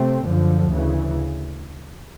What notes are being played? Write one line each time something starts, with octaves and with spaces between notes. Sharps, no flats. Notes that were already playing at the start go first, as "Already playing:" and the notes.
Already playing: C3 A3 C4
F#2 D3 F3
D2 C#3 E3